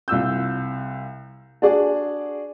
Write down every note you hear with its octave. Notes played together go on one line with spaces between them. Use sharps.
C2 F4 E6 G6
D4 F#4 G#4 D5